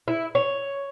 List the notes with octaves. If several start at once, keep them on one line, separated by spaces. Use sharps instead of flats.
E4
C#5